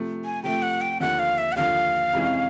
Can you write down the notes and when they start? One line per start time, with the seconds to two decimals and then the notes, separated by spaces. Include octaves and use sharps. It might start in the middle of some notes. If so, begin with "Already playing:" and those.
Already playing: C3 F3 A3
0.25 G#5
0.43 C3 F3 A3 G5
0.62 F#5
0.81 G5
1.00 D#2 D3 F3 F#5
1.19 F5
1.38 E5
1.52 F#5
1.56 D#2 D3 F3 F5
2.13 F2 C3 E3 G#3 C#4